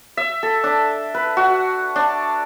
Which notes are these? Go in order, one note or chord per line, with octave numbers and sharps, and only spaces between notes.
E5
A4
D4
B4
F#4
D4